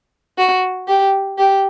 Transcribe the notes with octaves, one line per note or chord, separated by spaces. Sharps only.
F#4
G4
G4